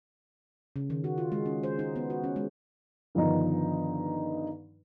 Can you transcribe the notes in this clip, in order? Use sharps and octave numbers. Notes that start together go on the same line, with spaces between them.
C#3
D#3
F#4
F4
G#3
C#4
C5
D#4
B3
F#4
C#4
G#3
G2 D3 D#3 F3 B3 D#4